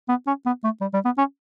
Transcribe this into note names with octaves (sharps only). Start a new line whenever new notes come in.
B3
C#4
B3
A3
G3
G3
B3
C#4